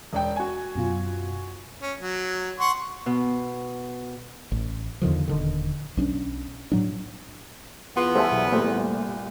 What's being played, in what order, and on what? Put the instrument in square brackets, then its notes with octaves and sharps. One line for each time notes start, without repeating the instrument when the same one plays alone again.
[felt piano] E1 D5 G5
F#4 G#5
[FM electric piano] F#2 B2 F4
[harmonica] C#4
F#3
F#5 C6 C#6
[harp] B2
[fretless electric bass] A1
E2 D3 D#3 F3
D#1 D3 D#3
B1 C#4 D4
A2 F#3 D4
[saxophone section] E2 B3 [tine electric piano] F4 [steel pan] C6
[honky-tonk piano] G3 E5 G#5 [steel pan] A4 C5 [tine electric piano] F5
[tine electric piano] B1
[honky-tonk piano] C2 A#2 [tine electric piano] G3 A3 G4 [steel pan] C5